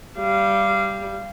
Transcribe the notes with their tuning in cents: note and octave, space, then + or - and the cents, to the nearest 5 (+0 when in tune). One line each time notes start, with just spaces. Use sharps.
G3 +0 F5 -20